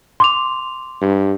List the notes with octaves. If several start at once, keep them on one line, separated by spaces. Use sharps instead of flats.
C6 D6 F7
G2